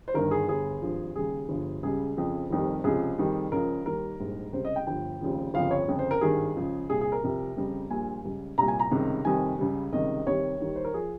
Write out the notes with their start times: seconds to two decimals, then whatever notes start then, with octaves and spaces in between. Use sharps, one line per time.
0.08 C5
0.14 G1 G2 D#3 G3 A#4
0.31 G#4
0.48 G1 G2 G3 G#4
0.82 G#1 G2 F3
1.15 D#2 C#3 G3 G#4
1.49 G1 G2 F3
1.83 C#2 C#3 G3 G#4
2.17 F2 C#3 F3
2.50 F1 F2 D#3 G3
2.84 C#2 C3 F3 G#4
3.18 F2 D#3 G3
3.52 C#2 C#3 F3 A#4
3.85 D#2 D#3 G3 A#4
4.20 A#1 G#2 G3
4.53 C#2 C3 G3 C5
4.65 D#5
4.76 G5
4.87 G1 G2 F3 G5
5.21 F1 D#2 C#3 F3
5.54 G1 F2 C#3 F3 F5
5.71 C#5
5.88 G1 F2 C#3
5.99 C5
6.11 A#4
6.21 G#1 G2 D#3 G3 G#4
6.56 C#2 C#3 F3
6.90 C2 A#2 G3 G#4
7.01 G#4
7.12 A#4
7.23 C2 C3 F3
7.57 F2 C#3 G3
7.90 A#1 A#2 G3 G#5
8.24 C#2 C#3 G3
8.58 C2 A#2 G3 A#5
8.68 G#5
8.80 A#5
8.91 C#2 C3 D#3 G3
9.25 F2 C3 D#3 G3 G#5
9.59 C#2 C#3 G3
9.93 C#2 C3 D#3 G3 D#5
10.27 C2 C3 D#3 G3 C#5
10.60 D#2 D#3 G3
10.76 C5
10.84 A#4
10.94 F3 G#4